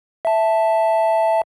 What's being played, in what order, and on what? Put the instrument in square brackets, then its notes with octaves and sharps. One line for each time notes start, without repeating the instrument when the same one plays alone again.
[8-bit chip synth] E5 A5